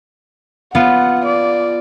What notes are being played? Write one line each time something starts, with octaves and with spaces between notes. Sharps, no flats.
B3 F4 F#5
D5